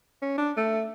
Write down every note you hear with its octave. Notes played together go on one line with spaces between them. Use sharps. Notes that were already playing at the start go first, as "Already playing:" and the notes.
C#4
D4
A3